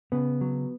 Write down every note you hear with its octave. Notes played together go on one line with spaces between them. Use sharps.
C#3 B3
F#3